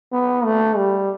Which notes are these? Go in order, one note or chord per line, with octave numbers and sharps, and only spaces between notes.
B3
A3
G3